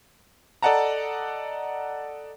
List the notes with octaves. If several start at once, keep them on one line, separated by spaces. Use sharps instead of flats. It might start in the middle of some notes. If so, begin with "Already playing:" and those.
A4 D5 D#5 F#5 A5 A#5